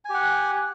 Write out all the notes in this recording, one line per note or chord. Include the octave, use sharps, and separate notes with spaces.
G4 F#5 G#5